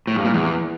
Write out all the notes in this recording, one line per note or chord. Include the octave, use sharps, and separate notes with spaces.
A2
G2
A#2
E2